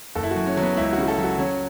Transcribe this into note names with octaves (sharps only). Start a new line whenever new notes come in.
F#1 A4
E4
F#4
F#2
C#4
F#3
B3
C#2 E4
F#4
C#3
F#4
A4
F#3
F#4
F#3 C#4